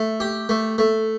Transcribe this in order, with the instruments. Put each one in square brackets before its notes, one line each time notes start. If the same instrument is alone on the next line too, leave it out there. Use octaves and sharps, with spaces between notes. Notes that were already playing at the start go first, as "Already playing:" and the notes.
Already playing: [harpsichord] A3
G4
A3
A3